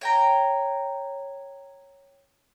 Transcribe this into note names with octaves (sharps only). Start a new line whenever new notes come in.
C#5 G5 A#5